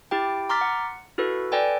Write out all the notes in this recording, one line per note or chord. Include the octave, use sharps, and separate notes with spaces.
E4 G4 G5
A#5 C6 D6 F6 A6 B6
F#5
E4 F#4 A4 B4
A4 B4 D5 G5 G#5